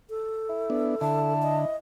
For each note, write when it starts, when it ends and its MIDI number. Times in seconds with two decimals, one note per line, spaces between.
0.10 1.34 69
0.49 0.96 64
0.70 0.95 59
0.70 0.95 62
1.01 1.65 50
1.01 1.76 64
1.01 1.57 81
1.42 1.76 75